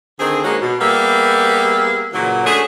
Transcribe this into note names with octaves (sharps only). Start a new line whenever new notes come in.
D3 D#3 C4 G#4
G#3 A#3 C#4 D#4 F#4
B2
G3 A#3 B3 G#4 E5 F5
A#2 C#3 E3 F#3
A3 C#4 D4 F#4 G#4